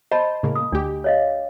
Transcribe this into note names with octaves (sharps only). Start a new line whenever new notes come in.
C5 D#5 A5 B5
A2 C#3 A#3
D#6
D2 D4 G4
C#5 D#5 F5